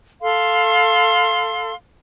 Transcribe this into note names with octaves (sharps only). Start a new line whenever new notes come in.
A4 F5 C6